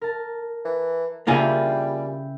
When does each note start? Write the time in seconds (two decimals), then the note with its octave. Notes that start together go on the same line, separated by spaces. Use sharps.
0.01 A#4 A5
0.65 E3
1.27 C#3 G3 A#3 E4 F4 G#4 G5